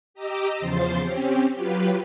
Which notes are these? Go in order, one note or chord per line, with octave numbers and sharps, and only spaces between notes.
G4 D#5 A#5 D6 E6
E2 C#3 F3 C5 C6 A6
C4 C#4 G4
F#3 F4 G4 B4